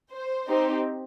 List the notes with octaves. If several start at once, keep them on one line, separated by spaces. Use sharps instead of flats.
C5
C4 D#4 G4